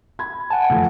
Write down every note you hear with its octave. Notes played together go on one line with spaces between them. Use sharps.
B5 G#6
F#5 G#5 A5
E3 F3 A3